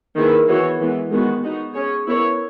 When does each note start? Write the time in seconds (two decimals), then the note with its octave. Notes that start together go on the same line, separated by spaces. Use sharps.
0.16 D#3 A#3 E4 G#4 B4
0.47 E3 B3 F#4 C#5
0.79 E3 G#3 B3
1.11 D#3 G#3 B3 F#4
1.43 B3 D#4 F#4
1.74 C#4 G#4 C#5
2.06 B3 E4 A#4 C#5